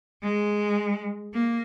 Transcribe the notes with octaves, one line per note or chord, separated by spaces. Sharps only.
G#3
A#3